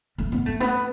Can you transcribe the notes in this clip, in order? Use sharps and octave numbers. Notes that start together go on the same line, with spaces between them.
A3
B3
A3
B3